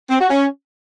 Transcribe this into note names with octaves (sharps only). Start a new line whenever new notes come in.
C4
F#4
C#4